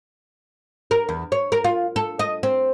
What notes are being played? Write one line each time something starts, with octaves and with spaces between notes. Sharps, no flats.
A#4
E2
C#5
A#4
F4
A4
D#5
C4